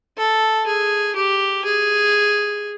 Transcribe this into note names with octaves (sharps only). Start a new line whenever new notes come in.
A4
G#4
G4
G#4